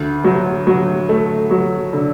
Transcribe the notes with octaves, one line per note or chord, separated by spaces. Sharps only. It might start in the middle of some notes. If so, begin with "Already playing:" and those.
Already playing: D2
F#3
F#3
A3
F#3
D3